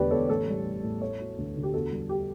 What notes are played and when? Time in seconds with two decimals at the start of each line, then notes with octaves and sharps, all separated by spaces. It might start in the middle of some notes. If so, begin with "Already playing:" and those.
Already playing: E1 D3 A3 G4 B4 D5
0.11 E2 A4 C#5
0.28 A1 A4 C#5
0.48 G3
0.66 A1
0.83 A2
1.01 A3 A4 C#5
1.20 F#3
1.38 D2
1.56 D3
1.63 G4
1.74 E2 F#4 A4
1.91 G3
2.09 G4